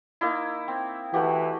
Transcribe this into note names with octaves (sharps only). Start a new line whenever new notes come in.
A#3 D#4 E4
C4
E3 A3 F#4 G4